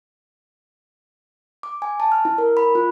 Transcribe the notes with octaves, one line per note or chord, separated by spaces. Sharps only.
D6
G#5
A5
F6
E4
A#4
B5
F4